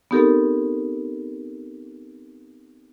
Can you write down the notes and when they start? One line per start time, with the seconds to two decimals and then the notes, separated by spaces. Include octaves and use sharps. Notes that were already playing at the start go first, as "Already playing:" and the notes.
0.11 B3 C4 D#4 G4 A4 A#4